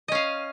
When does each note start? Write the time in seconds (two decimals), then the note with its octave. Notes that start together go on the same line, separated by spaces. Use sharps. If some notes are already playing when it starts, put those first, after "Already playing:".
0.08 D#5
0.12 C#4
0.15 F5